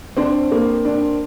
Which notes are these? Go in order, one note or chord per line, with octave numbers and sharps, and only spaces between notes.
C4 D4 C5
A#3
D4